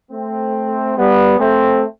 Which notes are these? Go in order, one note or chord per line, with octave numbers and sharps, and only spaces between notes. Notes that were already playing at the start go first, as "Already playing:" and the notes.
A3 C4
G3 B3
A3 C4